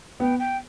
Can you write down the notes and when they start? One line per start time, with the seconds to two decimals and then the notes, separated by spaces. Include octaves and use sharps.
0.20 B3 G5
0.39 G5